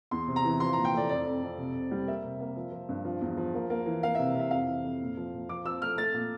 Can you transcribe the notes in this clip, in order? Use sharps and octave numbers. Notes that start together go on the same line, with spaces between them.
E2 C6
C3
A#5
E3
F3 C6
A#2 A#5
G5
A3 D5
F2 D5
F2
F2
C3
C3
G3
A#3 E5
C3
A#3
F3
F3
G2
F3
E2
F3
A#3
A#3
E3
A#3 F5
C3 E5
C3 E5
F2 F5
E3
F2
A#2
F3
A#2
F3 D6
F3 E6
A3 F6
A3 A6
A#2